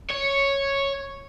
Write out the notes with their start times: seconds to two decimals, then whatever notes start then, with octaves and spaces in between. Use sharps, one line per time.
0.11 C#5